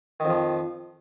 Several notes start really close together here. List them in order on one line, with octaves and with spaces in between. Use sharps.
D#3 F2 F3